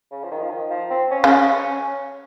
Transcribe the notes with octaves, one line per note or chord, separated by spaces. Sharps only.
C#3
F3
D#3
F3
D#3
F3
C4
C#4
C#3